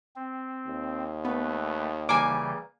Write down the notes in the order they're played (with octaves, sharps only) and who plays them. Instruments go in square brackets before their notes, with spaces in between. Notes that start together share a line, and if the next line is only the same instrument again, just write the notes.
[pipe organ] C4
[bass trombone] D#2
[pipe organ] A3 B4 [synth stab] B3
[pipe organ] C#3 E3 G3 [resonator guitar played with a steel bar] A#3 G#5 [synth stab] D6